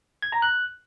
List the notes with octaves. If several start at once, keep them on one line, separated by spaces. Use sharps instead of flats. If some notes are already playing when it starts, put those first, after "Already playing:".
G#6
A#5
F#6